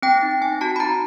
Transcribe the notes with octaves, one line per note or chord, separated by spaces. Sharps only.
C4 G5
D#4
C4 G#5
F#4 A5
B5
D#4 A#5